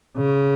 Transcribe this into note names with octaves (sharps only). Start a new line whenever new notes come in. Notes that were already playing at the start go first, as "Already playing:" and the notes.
C#3